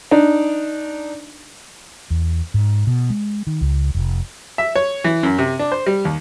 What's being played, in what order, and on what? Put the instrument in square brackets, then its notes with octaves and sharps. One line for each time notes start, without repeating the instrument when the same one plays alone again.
[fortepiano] D4 D#4
[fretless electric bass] E2
G#2
B2
G#3
D#3
C#2
F1
[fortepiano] E5
C#5
E3
F#2
C3
D4
C5
G3
D#2